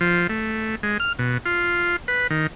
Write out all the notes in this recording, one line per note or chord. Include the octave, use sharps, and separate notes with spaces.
F3
A3
G#3
F6
B2
F4
B4
D#3